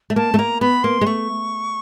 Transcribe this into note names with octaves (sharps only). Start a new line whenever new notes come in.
A3
A#3 A5
A3
A#3 A#5
B3 B5
A#3 C6
G#3
A3 C#6